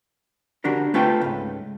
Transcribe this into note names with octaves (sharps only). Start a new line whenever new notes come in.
D3 D4 F#4 G4 A#4
A3 C4 F4 A4 B4 G5
C#2 G#2